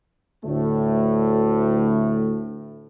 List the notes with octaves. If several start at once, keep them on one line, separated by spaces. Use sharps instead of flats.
D2 A2 A3